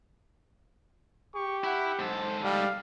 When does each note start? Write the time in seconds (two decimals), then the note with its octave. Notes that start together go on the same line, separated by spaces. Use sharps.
1.35 G4 C#6
1.64 E4 F#5
1.99 G#2 A4 C5
2.43 G3 F5